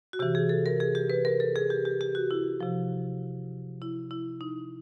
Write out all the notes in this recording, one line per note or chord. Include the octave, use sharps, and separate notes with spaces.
F#4
C3 E3 G4
G#4
A4
A#4
G#4
G4
B4
A#4
A4
G#4
G4
G4
G4
F#4
E4
C3 F3
E4
E4
D#4